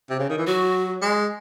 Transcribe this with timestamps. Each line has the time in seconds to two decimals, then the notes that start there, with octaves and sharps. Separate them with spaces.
0.10 C3
0.19 C#3
0.29 D#3
0.38 E3
0.47 F#3 F#4
1.01 G#3